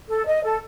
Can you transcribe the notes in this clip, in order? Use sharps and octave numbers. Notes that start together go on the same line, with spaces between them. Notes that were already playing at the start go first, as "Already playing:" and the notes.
A4
D#5
A4